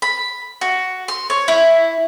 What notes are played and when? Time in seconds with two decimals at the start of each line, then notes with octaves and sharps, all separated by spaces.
0.02 B5
0.61 F#4
1.08 C6
1.30 C#5
1.48 E4